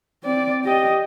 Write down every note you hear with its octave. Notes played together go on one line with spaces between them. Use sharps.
C4 D5
G4 D#5